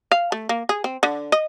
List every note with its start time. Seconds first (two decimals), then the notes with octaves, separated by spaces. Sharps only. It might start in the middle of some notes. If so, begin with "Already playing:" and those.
0.11 F5
0.32 A3
0.49 A#3
0.69 G#4
0.84 C4
1.03 D3
1.32 D#5